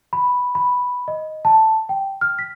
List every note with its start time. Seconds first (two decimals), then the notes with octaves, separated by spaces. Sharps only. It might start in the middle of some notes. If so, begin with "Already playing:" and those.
0.13 B5
0.55 B5
1.08 D#5
1.45 A5
1.89 G5
2.21 F6
2.39 B6